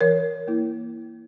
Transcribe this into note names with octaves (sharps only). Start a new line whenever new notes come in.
E3 A#4 C#5
A#3 E4